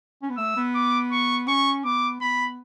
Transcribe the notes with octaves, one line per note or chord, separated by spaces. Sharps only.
C#4
B3
A3 E6
B3
D6
C#6
C#4 C#6
B3 D6
B3 B5